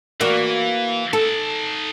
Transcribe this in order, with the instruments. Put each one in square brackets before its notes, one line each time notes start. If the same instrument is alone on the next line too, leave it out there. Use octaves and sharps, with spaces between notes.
[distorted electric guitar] E3 [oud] A#3 F#4 D5
[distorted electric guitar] D#4 A5 [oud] A4